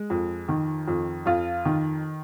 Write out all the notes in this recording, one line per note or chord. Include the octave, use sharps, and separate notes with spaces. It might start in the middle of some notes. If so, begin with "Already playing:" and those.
Already playing: G#3
F2
D#3
F2
F2 F4
D#3